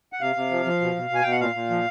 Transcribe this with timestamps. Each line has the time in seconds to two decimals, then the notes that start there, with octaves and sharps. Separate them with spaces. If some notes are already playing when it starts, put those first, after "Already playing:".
0.13 F#5
0.21 C3 F5
0.36 C3
0.51 F3
0.66 F3
0.81 B2
0.96 B2
1.10 B2 G#5
1.23 B2 G5
1.32 F#5
1.40 A#2 F5
1.55 A#2
1.70 F3